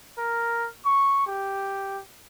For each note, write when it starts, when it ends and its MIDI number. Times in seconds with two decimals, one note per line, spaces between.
0.17 0.68 70
0.85 1.24 85
1.26 2.00 67